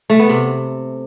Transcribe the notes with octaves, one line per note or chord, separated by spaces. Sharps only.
A3
B3
C3